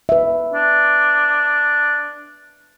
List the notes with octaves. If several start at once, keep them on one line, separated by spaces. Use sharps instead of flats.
B4 E5
D4